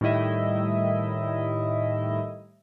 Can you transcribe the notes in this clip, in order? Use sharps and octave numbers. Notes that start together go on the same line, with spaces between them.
A2 D#3 G3 E4 D#5 E5